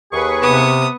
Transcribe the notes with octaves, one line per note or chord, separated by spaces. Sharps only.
D#2 G#4 B4 C#6
C3 B3 D#6